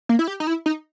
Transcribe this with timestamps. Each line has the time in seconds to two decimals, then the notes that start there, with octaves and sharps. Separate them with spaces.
0.09 A#3
0.19 E4
0.28 G4
0.40 D#4
0.47 E4
0.66 D#4